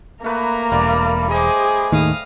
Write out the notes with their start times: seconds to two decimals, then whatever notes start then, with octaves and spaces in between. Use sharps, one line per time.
0.24 A3 A#3 B4 A#5
0.72 E1 G3 D5
1.31 G#4 C5 D#5 D6
1.92 D#2 A2 D#3 F5 D#6